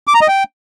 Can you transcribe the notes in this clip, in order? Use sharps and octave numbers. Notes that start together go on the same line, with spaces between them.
D6
A#5
D#5
G5